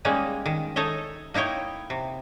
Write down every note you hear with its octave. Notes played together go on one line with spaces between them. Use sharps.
G3 G#3 A#3 C#4 D#4
D#3
D#4 A4 C#5 D#5 E5
A#3 D#4 E4 C#5 G5
C3